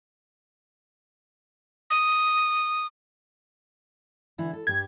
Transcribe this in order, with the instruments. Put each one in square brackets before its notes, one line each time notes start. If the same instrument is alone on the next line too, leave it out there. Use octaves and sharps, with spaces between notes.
[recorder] D#6
[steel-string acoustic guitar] D3 E3 E4
A4
[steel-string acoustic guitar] G2 G4 [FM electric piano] G#6